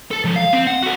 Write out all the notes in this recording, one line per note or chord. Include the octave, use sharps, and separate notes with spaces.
A4 A5
F3 G#3
F5
C4
F#5
F#4 A4